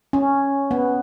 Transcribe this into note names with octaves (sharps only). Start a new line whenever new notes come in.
C#4
B3